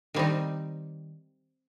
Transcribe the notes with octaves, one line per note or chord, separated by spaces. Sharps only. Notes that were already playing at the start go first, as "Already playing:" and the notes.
D#3 G3 C4 D#4